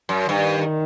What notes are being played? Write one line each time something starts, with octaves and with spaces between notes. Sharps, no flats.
F#2
G2 D#3